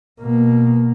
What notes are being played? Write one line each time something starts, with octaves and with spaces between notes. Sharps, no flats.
B2 A#3